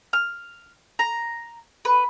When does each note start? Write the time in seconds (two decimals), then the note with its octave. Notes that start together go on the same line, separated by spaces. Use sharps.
0.13 F6
0.99 A#5
1.85 B4